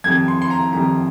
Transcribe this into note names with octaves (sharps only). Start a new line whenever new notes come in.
F2 D#3 G3 G#6
C6
C6
A#5
F2 D#3 G3 A#5